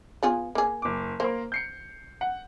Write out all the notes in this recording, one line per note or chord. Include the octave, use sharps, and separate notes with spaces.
B3 F4 G#4
A#3 G#4
F#1 D6
A#3 A#4 C5 C6
G6 C7 C#7
F#5